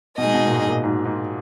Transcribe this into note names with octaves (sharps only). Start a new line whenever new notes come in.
B2 G#3 D#4 G#4 D#5
B2
A#2
G#2
A#2
G#2
G#2